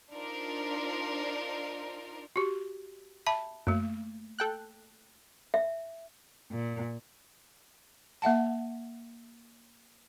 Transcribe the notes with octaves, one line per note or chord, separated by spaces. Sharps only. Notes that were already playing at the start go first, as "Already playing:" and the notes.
D4 D#4 F4 A#4 C5
F#4 G4
E5 A5 B5
F#2 A3 A#3
A4 G5 F#6
E5
A#2
A#3 E5 F#5 A5